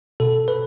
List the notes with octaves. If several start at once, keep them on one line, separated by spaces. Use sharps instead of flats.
B2 A4
B4